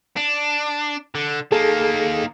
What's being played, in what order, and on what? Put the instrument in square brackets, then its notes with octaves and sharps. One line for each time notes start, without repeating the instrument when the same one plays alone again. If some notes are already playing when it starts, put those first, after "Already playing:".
[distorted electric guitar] D4
D3
[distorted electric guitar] D#3 A#3 [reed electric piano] G#4 A4